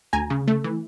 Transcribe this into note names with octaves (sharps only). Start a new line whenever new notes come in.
D2 G#5 A#5
C#3
A3
E3